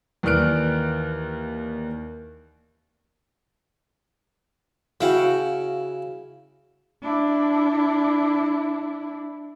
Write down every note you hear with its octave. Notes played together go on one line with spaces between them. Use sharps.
D#2 E3 D5 F6 F#6 D7
C#3 E4 F#4 F5 G5
D4 E4